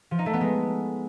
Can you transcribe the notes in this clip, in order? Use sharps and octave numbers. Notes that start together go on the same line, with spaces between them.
F3
D#4
A3
B3
G#3